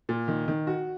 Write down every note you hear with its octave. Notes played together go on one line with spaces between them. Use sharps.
A#2
D#3
D#3
F#4